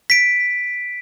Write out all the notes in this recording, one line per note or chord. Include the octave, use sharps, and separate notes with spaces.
B6 D7